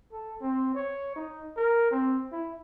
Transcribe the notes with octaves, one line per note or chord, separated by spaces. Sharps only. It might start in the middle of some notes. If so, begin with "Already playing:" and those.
A4
C4
C#5
D#4
A#4
C4
E4